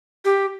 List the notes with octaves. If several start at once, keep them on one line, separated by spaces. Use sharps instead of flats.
G4